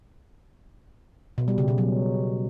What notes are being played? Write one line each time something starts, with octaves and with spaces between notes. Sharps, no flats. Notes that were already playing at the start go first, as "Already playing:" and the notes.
B2
G3
C#3
B2
F#3